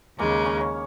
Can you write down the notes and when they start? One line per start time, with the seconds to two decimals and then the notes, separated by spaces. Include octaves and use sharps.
0.18 D#2 C#3 G#3 A#3
0.46 C#4
0.61 C#4